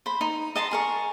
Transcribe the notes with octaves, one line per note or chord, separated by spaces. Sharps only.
C5 B5
D#4
D#5 A5 A#5 C6
G#4 A#4 C#6